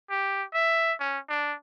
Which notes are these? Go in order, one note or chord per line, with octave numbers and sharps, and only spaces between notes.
G4
E5
C#4
D4